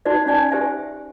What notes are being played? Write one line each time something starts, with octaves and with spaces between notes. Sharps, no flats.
D#4 F#4 C5 D5 D#5
C#4 D#4 D5 G#5
G4 C5 E5 G#5